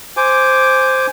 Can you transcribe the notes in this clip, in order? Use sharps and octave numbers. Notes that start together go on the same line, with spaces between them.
C5 G#5 D6